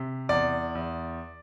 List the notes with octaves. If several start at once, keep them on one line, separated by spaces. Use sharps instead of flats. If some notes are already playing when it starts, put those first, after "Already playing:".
Already playing: C3
E2 D5
E2